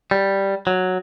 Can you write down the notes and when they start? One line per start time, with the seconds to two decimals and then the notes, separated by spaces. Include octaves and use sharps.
0.11 G3
0.67 F#3